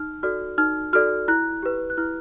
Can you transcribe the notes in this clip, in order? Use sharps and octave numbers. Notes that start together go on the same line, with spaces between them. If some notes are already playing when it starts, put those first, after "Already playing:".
Already playing: D#4 F6
F#4 A4 D5 F6
D#4 F6
F#4 A4 D5 F6
E4 F#6
G4 B4
F#6
E4 F6